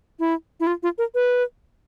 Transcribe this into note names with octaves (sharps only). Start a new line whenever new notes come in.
E4
E4
F4
F4
A#4
B4